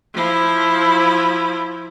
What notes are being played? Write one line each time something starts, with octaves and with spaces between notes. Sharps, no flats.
F3 E4